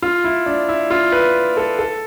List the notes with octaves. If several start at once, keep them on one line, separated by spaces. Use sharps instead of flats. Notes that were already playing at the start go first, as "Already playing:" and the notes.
F4
E4
D4
E4
F4
B4
A4
A4